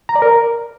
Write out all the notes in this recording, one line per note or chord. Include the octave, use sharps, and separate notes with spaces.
A#5
D5
A#4